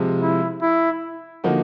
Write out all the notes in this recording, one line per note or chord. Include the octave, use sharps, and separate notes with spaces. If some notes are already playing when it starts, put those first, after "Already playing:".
Already playing: C3 F3 G#3
E4
E4
D3 F3 A#3 D#4 F#4